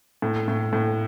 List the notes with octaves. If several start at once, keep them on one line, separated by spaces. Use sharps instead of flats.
A2
A2
A2